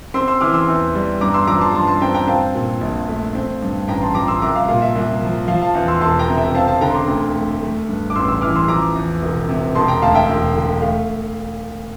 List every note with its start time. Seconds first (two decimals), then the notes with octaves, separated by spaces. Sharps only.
0.14 C4 C6 E6
0.27 C6 E6
0.41 E3 D6 F6
0.54 C6 E6
0.68 E2
0.95 G3
1.21 G2 A#5 D6
1.34 C6 E6
1.47 F3 A#5 D6
1.61 A5 C6
1.75 G2 A5 C6
1.87 A5 C6
2.01 C4 G5 A#5
2.14 G5 A#5
2.28 C4 F5 A5
2.55 A#2
2.81 A#1
3.09 A3
3.35 C4
3.62 G2
3.88 A1 G5 A#5
4.02 A5 C6
4.15 F3 A#5 D6
4.28 C6 E6
4.42 C2 A#5 D6
4.55 F5
4.68 A#2 F5
4.82 E5
4.95 C2
5.22 F3
5.48 F3 F5
5.62 F5 A5
5.75 E2
5.88 C6 E6
6.01 E1 A5 C6
6.19 G5 A#5
6.28 C3
6.37 E5 G5
6.54 C4 F5 A5
6.68 F5 A5
6.81 D3 G5 A#5
6.90 C6
6.95 A#5 D6
7.08 D2
7.35 A3
7.62 A3
7.88 G2
8.10 D6
8.16 A1 C6 E6
8.28 C6 E6
8.41 E3 D6 F6
8.56 C6 E6
8.68 F3 A#5 D6
8.95 E2
9.22 E1
9.48 C3
9.75 E1 A5 C6
9.88 G5 A#5
10.02 D2 F5 A5
10.15 E5 G5
10.29 E1
10.56 D3
10.82 A3 F5